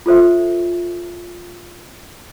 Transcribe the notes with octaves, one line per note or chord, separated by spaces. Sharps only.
F4 A4 C5 E5